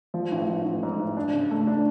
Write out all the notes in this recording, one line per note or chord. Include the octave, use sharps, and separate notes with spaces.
F3
A1
A1
A1
G#2
A1
D4
C#3
A3
D4